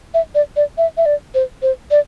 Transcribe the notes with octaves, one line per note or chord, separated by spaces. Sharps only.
E5
D5
D5
E5
E5
D5
C5
C5
D5